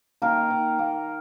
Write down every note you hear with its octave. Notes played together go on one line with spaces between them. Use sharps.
D#3 A#3 A#4
D#3
A#3